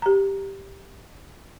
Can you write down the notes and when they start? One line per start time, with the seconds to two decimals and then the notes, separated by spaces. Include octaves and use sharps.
0.02 G4 A#5